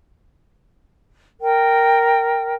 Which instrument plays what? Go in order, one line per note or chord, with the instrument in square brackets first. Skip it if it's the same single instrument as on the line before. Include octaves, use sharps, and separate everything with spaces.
[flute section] A#4 G5